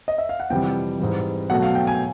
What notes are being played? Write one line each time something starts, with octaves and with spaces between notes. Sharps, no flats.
D#5
E5
F5
F#5
F2 C3 E3 G3 G5
G#2 E3 G3
B2 F#3 A3 F#5
F5
G5
G#5